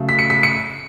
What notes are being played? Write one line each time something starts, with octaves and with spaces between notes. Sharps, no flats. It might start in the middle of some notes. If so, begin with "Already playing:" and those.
Already playing: C#3 F#3 A3
B6
C#7
B6
C#7